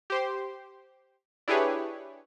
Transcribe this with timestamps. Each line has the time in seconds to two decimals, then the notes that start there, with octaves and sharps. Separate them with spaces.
0.10 G4 C5 C6
1.48 D4 E4 G4 G#4 B4 C#5